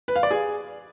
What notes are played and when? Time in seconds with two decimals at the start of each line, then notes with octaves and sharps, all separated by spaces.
0.08 B4
0.16 F5
0.23 D5
0.31 G#4